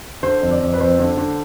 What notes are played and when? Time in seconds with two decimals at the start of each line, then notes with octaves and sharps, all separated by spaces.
0.23 D3 C5
0.42 F2
0.51 D5
0.61 F2
0.73 B4
0.79 F2 C5
0.99 D3
1.17 D3